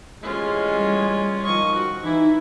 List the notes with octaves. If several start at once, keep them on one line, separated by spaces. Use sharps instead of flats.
A1 G#3 C#4 F4
G3
D#3 F3 D#5 C#6
F#4
E3 D#4 E4